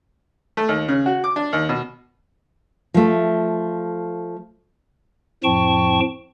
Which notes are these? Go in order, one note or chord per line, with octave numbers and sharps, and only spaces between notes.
A3
D#2
C#3
F#4
D6
D4
D#2
B2
F3 A3
F2 A2 F3 G5 A5 C#6